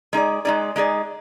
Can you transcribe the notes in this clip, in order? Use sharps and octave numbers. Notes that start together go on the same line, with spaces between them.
G#3 D#4 G#4 D5
G#3 D#4 G#4 D5
G#3 D#4 G#4 D5